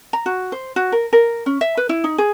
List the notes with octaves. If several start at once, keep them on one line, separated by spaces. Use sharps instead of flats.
A#5
F#4
C5
F#4
A#4
A#4
C#4
E5
B4
E4
D#4
G#4